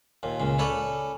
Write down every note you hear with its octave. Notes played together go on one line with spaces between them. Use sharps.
D#2 A#2
C#2 A#2 C#3
C#4 A4 B4 C#5 D5